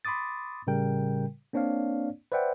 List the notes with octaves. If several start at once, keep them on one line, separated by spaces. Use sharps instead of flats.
B5 C6 D6 D#6 A6
A2 C#3 G3 A#4 G5
A#3 C4 D4 C#5 D5 F5
B4 C5 D5 E5 F#5 G5